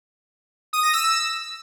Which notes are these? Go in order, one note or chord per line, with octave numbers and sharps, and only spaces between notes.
D#6
A#6
E6